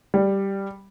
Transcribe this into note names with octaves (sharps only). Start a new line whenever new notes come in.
G3